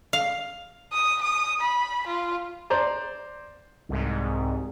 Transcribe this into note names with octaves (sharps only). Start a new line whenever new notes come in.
F5
D#6
D#6
B5
F4
C5 D5 A#5
C2 G#2